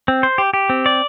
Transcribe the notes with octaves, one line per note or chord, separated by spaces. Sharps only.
C4
C5
G4
G4
C4
D5